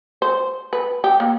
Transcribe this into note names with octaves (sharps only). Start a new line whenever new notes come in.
C5
B4
G4
A#3